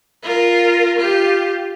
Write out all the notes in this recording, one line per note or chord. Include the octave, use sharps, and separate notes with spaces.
F4 A#4
F4 G4